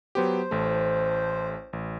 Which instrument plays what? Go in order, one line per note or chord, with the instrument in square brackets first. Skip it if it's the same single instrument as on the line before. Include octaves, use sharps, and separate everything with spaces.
[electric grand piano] F#3 B3 G4 [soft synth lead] C5
[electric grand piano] A1 A3
A1